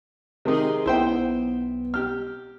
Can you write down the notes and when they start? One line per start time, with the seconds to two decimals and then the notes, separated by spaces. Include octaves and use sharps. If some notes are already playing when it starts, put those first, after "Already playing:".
0.45 C3 D#3 D#4 G#4 C6
0.86 B1 B3 E4 C5 G5
1.94 G4 F6